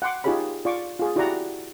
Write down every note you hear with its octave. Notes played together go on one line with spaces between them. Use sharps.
F#5 G5 C6 D6
D#4 F4 G4 G#4 C#5 B5
F4 D5 F5 C#6 D6
F4 G#4
E4 F#4 G4 D5 F#5 A#5